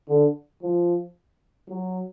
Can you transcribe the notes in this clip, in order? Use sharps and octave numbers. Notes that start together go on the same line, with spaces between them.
D3
F3
F#3